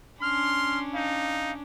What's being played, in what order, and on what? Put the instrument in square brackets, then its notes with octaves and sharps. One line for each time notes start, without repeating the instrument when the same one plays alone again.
[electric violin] C#4 D4 [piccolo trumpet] C6 [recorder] F6
[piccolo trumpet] D#4 [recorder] F5